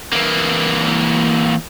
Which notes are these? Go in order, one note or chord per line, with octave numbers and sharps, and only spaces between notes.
E3 A#3